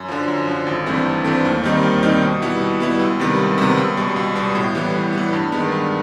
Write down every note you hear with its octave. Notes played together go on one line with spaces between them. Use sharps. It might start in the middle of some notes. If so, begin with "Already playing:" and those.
Already playing: F#2
D3 F3
F#2
D3 F3
G#1
G2 E3 A3 C4
G#1
G2 E3 A3 C4
D#2
D#3 G3 C4 D#4
D#2
D#3 G3 C4 D#4
B2
G3 B3 E4
B2
G3 B3 E4
C#2
C3 D#3 G3 B3
C#2
C3 D#3 G3 B3
C#2
B2 G3
C#2
B2 G3
A2
E3 G3 B3
A2
E3 G3 B3
G2
D#3 G#3 B3
G2